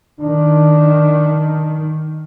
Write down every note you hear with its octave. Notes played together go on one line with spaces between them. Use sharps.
D#3 D4